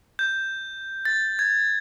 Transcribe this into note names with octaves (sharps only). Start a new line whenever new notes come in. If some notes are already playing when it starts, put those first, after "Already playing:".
G6
A6
G#6